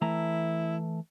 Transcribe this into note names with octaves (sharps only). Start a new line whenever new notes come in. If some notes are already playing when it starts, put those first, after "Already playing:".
E3 A3 E4 A#5